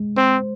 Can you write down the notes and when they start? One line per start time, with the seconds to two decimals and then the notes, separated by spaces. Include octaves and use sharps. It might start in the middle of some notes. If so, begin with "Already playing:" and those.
Already playing: G#3
0.17 C4 C5